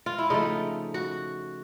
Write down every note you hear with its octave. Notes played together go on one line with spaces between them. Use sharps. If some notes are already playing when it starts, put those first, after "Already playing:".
F4
E4
C#3 F3 A3 D#4
F#4